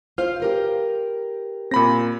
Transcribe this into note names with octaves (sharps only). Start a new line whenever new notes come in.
F4 C5 F5 F6
G4 A#4 B4
A#2 C4 B5 A#6